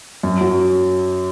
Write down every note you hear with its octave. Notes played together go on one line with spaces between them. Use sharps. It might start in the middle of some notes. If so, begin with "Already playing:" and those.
F#2
F#3